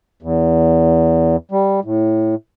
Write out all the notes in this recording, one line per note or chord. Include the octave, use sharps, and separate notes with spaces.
E2
G3
A2